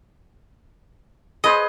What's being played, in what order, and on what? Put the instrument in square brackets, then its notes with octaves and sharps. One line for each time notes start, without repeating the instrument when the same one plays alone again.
[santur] G#4 B4 C5 [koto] D#5